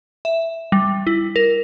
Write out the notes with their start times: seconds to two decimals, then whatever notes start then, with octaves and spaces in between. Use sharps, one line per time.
0.25 E5
0.72 G3
1.07 E4
1.36 A#4